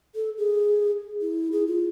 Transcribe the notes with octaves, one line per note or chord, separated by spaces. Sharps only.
A4
G#4
E4
G#4
F4